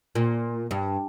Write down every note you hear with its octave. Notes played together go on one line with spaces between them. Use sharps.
A#2
G2